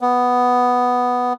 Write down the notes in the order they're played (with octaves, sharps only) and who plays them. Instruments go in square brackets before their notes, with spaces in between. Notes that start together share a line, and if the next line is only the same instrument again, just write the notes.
[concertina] B3